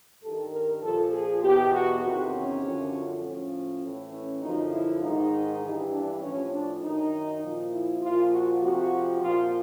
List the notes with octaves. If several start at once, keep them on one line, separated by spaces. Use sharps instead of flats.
G2 D#3 A4
A#4
A#2 F3 A4
G#4
E2 B2 G4
F#4
E2 C3 D#3 F#4
C#4
F#2 D3 F3
A2 F3 C#4
A2 E3
C#4
F#2 D3 F3 D#4
E4
G#2 D#3 D#4
G2 E3
D4
A2 F3 C#4
D4
F#2 D#3 D#4
A#2 F3
E4
A#2 F3 F4
F#4
F2 C3 F3 F#4
A#2 F3 F4